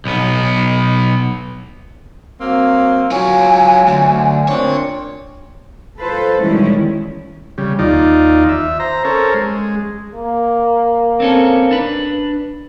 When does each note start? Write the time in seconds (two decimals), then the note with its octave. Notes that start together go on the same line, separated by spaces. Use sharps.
0.05 B1 B3
2.40 F#3 A#3 C4
3.11 F#3 F4 C#5 G#5
3.88 D2
4.48 A#2 C4 D4 C#5
6.00 F4 A4 B4 C5
6.41 B2 D#3 G3 G#3 C#4 E4
7.58 C#3 G3
7.79 D#2 D#4 F4 D5
8.49 E5
8.80 C5 A#5
9.05 C#4 A4 A#4 C5
9.34 G#3
10.14 A#3
11.20 C4 C#4 A4
11.71 D4 B4